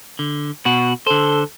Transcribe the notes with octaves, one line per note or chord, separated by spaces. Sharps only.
D3
B2 F#4
D3 A4 C5